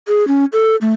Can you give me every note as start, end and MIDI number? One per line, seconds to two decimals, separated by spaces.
0.08 0.27 68
0.28 0.45 61
0.53 0.76 69
0.81 0.94 57